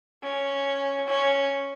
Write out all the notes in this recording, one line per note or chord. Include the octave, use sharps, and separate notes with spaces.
C#4
C#4